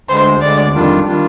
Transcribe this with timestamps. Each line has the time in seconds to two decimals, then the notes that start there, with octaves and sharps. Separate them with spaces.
0.09 D2 D3 G#3 C5
0.42 D2 D3 G#3 D5
0.73 F2 D#3 G3 D4 F4
1.06 D#3 G3 D4 F4